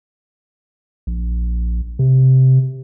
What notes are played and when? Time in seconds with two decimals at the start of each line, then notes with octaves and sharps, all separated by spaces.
1.07 A#1
1.99 C3